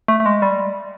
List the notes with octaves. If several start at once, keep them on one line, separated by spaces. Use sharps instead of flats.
A3
A3
G#3
G3